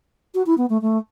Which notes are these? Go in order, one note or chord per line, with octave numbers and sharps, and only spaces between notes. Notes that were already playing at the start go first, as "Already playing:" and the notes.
F#4
E4
B3
A3
A3